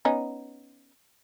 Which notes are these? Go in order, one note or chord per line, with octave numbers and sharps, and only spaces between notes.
B3 C#4 D#4